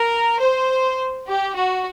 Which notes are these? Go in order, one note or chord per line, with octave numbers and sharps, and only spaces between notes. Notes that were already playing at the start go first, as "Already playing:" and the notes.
Already playing: A#4
C5
G4
F#4